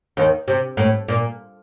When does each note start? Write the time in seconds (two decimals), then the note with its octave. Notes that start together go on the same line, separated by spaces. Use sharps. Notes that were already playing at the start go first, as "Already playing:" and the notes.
0.17 D#2 D#3
0.48 C3
0.77 A2
1.08 A#2